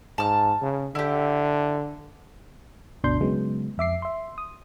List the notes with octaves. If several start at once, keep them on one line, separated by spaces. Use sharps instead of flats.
G#2 A5 F6
C#3
D3 E4 G4
G1 D2 B2 D4 C6 G6
C#3 F#3 G#3 B3
F2 E5 D6 C7
E5 C6
D#6